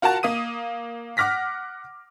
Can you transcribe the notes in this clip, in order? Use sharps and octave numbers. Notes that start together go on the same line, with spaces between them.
F4 F#4 A#4 F#5 A5
A#3 D#6 D#7
F#5 D6 F6 A#6 B6